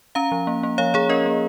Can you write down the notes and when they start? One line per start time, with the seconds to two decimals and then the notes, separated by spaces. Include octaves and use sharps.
0.15 C#4 F5 A#5
0.32 F3
0.47 A#3
0.63 A#3
0.78 F3 C#5 F5
0.94 F3 G#4 C#5
1.09 C#4 A#4 D#5
1.26 A#3